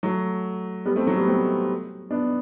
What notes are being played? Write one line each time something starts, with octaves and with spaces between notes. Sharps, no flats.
F#3 A3
G3 B3
A3 C4
F#3 A3
G3 B3
A3 C4
B3 D4